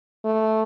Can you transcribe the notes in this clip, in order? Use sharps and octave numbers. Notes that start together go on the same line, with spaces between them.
A3